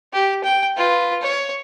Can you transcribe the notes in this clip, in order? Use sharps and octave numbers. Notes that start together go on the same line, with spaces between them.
G4
G5
F4 B4
C#5